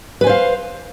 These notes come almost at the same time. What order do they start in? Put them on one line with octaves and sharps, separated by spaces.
B4 G#5 C5 F5